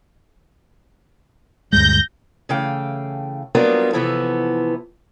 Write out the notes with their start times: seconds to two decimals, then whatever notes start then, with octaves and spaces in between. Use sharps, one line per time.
1.73 D2 G2 G#3 G6 A#6
2.49 C#3 E3 A3 F5 G5
3.55 F#3 G3 A#3 B3 D4 F4
3.93 C3 E3 F3 B3 E4 A4